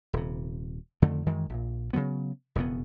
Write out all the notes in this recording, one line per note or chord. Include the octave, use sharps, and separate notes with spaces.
D#1 C3
F2 D3 D#3 A3
F#2 D#3 E3 G#3
A#1 A#2
C#3 F3 F#3 B3
E1 F2 C#3 B3